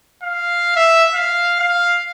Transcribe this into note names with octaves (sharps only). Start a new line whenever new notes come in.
F5
E5
F5
F5